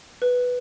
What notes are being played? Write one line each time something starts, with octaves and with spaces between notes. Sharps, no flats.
B4